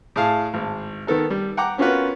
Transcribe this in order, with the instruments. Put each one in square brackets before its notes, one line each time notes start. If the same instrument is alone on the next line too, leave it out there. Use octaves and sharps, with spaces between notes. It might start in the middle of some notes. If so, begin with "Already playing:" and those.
[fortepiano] A2 G#4 F5 A5
G#1
D#3 B3 A4 A#4
G3
F#5 G5 A#5 D6
B3 C#4 F4 F#4 A#4 B4